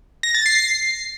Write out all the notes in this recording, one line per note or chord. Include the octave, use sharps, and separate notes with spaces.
A#6
A6
C7